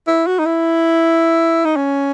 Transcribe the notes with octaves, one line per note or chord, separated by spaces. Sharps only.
E4
F#4
D#4
E4
D#4
C#4